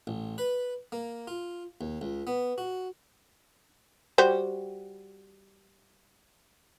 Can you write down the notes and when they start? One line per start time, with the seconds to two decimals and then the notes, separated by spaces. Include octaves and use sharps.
0.07 A1
0.38 B4
0.92 A#3
1.27 F4
1.81 D#2
2.01 C#2
2.27 B3
2.58 F#4
4.18 G3 F#4 C5